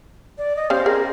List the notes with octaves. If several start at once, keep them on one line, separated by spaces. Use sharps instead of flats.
D5
D#5
C#4 G4 C5 F5
G#4 A#4